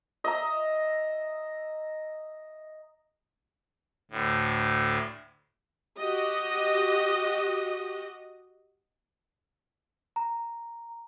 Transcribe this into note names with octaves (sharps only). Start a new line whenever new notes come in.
D#5 E5 A#5
D2 A2
F#4 G4 D#5
A#5